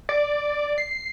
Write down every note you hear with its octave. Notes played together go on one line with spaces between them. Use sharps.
D5
C7